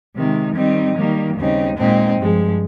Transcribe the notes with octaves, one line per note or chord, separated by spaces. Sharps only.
C3 D#3 G#3
D#3 G3 C4 D#4
D#3 G3 A#3
D#2 C#3 G3 C4 D#4
A#2 G#3 C4 D#4
G2 F3 G#3